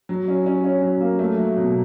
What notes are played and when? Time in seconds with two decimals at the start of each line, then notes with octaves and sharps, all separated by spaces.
0.09 F#3
0.28 C#4
0.46 C#4
0.64 C#4
0.82 F#3
1.01 A#3
1.19 A3
1.37 F#3
1.57 B2